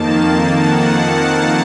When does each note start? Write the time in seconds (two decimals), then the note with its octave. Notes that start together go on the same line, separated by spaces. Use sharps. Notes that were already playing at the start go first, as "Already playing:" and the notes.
Already playing: F2 D#3 A#3 A5
0.12 A5
0.56 F#5